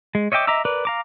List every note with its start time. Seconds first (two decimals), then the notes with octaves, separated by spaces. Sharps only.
0.15 G#3
0.32 C#5 D#5 E5 G5 D6
0.47 D#5 E5 A#5 D6 E6
0.65 A#4 B4 D5
0.85 F5 A#5 D6